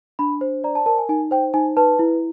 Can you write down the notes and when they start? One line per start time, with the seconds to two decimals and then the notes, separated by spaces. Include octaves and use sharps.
0.19 D4 B5
0.41 C5
0.64 D5 A#5
0.75 A5
0.86 A#4 A5
0.98 G#5
1.09 D#4 G#5
1.31 C5 G5
1.54 D#4 G#5
1.77 B4 A5
1.99 E4